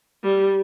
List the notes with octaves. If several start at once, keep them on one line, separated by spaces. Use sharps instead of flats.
G3